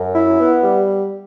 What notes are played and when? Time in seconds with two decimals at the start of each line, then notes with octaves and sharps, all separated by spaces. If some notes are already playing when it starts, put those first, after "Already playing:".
Already playing: F#2
0.14 E4
0.39 B3
0.63 G3